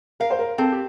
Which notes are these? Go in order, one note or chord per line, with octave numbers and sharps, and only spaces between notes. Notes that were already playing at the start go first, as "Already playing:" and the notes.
A#4 F5
C5
A#4
C4 A4
G4